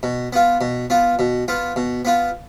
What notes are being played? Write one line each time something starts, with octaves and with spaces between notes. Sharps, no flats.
B2
B3 F4
B2
B3 F4
B2
B3 F4
B2
B3 F4